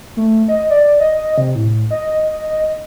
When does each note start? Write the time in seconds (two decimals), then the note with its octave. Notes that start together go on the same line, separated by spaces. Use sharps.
0.17 A3
0.48 D#5
0.70 D5
1.00 D#5
1.38 C3
1.55 A2
1.91 D#5